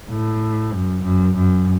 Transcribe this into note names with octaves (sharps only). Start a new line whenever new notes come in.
A2
F#2
F#2
F#2